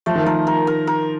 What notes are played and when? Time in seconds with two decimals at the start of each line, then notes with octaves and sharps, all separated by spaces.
0.06 F3 A3
0.15 D#3
0.24 F3 A#4
0.47 A#4
0.67 A#4
0.87 A#4